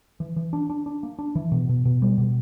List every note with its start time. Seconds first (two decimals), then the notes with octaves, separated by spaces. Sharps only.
0.20 E3
0.36 E3
0.53 D4
0.70 D4
0.86 D4
1.03 A#3
1.19 D4
1.35 E3
1.52 B2
1.69 B2
1.85 B2
2.02 G3
2.18 B2